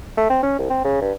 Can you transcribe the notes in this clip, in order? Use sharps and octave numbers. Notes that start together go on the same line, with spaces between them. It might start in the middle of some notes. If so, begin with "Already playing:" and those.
A3
C4
C#4
C2
C4
C#3
G2